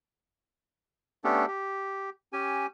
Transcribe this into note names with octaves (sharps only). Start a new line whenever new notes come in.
A3 B3 C#4 D4 G4 A4
G4
C#4 G4 G#5